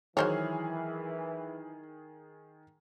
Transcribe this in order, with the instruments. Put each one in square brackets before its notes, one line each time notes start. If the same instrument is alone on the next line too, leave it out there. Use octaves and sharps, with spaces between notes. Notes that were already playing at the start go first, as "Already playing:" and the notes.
[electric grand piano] D#3 G#4 F6 [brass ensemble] E3 [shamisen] F#3 C5 C#5